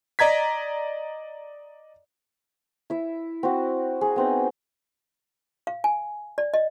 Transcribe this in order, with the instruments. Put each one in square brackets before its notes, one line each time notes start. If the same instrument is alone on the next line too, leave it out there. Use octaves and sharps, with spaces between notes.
[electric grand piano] D5 D#5 A#5 G#6 B6
[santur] E4 E5
C4 F#4
G#4
B3 C4 D#4
[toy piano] F5
G#5
D5
D#5